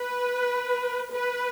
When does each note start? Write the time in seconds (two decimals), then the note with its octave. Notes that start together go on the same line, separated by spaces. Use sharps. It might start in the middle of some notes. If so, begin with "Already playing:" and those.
Already playing: B4
1.12 B4